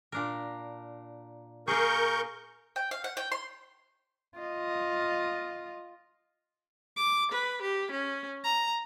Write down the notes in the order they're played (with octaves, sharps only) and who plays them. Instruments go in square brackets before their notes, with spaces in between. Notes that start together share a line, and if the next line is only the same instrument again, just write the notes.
[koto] A#2 D4 A#4
[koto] A#3 G#4 [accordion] A#4 C#6 G6
[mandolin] G5
F5
F#5
G5
C6
[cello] F4 D#5
[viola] D6
B4
G4
C#4
A#5